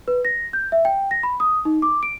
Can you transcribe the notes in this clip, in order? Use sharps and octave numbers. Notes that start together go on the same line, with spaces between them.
B4
A#6
G6
E5
G5
A#6
B5
D#6
D#4
D6
D7